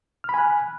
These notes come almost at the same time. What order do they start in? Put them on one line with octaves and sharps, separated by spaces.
F6 B5 G#5 F#6